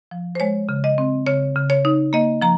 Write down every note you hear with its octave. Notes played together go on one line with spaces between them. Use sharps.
F3
C5
G#3 C#5
C#3
D#5
C4
C#3 C#5
C#3
C#5
D#4
A#3 D#5
F3 A#5